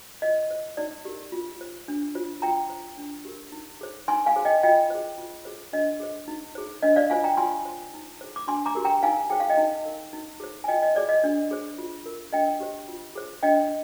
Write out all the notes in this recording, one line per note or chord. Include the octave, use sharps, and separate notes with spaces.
F4 D#5
C5
D#4 D5
G4 A#4
F4
C5
D4
F4 C5
F4 G5 A#5
C5
D4
G4 A#4
D#4
G#4 C5
D#4 G#5 C6
F5 G#5
G#4 C5
D#5 G5
F4 D#5 G5
G#4 C5
F4
G#4 C5
D4 D#5
G#4 C5
D#4
G#4 C5
D4 D#5
D5 F5
F4 C5 F5 G#5
G5 A#5
F4 G#5 C6
C5
D#4
G#4 C5
D6
D4 G#5 C6
A#5 D6
G4 A#4
G5 A#5
D#4 F5 G#5
G#4 C5 G5
F5
D#5 G5
D#4
A#4
D#4
G#4 C5
G#5
F4 D#5 G5
D#5
G#4 C5 D5
D#5
D4
G#4 C5
F4
A#4
D4 D#5 G5
G4 C5
F4
G#4 C5
D4 D#5 G5